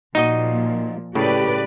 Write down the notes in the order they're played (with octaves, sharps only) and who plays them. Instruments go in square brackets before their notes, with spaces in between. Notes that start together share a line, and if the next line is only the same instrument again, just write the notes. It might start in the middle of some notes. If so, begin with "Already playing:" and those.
[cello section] A#2 F3 [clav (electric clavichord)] D#4 F#4 D#5
[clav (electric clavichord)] A2 C#3 [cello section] G4 B4 D5